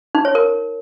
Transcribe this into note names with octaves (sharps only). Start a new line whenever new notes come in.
D#4
C#5
A#4